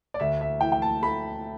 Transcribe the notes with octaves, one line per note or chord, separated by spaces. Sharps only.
D5
D2 E5
E5
E3 G5
G5
A5
A3 B5